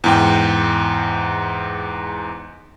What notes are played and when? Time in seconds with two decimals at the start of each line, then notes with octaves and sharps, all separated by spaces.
0.04 E2 G#2 G5